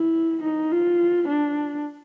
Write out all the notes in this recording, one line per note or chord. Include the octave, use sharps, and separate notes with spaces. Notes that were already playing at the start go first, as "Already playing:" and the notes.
Already playing: E4
D#4
F4
D4